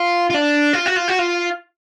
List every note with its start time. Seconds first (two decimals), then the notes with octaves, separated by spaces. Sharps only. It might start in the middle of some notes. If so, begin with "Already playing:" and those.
Already playing: F4
0.30 F4
0.34 D4
0.73 F4
0.86 F#4
0.96 F4
1.08 F#4
1.19 F4